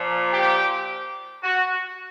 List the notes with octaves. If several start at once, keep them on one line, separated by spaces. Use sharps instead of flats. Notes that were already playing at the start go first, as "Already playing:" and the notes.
Already playing: A#2 F3
G4
F#4